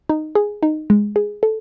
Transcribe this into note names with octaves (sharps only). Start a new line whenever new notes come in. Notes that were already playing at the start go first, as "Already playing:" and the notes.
D#4
G#4
D#4
G#3
G#4
A4